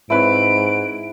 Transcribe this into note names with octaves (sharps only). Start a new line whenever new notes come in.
G#2 C4 E4 B4 C#5 D7